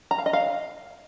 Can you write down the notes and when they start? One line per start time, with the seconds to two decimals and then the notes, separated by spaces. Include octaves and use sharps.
0.11 A#5
0.18 F5
0.26 D#5
0.33 F5